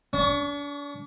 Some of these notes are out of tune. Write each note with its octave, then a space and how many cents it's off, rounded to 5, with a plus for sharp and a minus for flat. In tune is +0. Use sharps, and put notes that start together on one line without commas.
D4 -40 C#6 +20